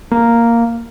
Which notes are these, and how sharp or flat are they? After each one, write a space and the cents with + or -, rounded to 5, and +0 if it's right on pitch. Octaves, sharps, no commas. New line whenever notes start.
A#3 -5